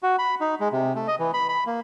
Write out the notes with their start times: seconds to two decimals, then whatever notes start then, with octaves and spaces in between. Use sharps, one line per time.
0.03 F#4
0.19 B5
0.41 D#4
0.60 G#3
0.72 C3
0.96 A3
1.08 D#5
1.19 E3
1.33 B5
1.49 B5
1.66 A#3